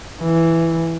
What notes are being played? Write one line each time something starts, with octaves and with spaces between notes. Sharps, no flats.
E3